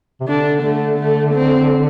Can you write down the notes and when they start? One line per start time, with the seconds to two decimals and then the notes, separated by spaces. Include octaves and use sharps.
0.21 C3
0.27 D3 D4
0.62 D3 A3
0.99 A3
1.34 C4